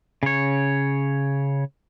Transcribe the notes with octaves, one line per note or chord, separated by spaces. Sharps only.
C#3 C#5